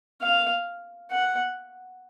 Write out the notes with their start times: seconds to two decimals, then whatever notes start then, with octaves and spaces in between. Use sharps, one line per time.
0.22 F5
1.11 F#5